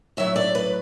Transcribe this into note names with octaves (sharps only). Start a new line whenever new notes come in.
A2 F#3 E5
D5
B4